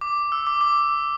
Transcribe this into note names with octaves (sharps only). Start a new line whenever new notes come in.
D6
E6
D6
D6